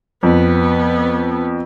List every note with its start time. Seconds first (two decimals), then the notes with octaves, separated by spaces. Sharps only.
0.23 F2 B3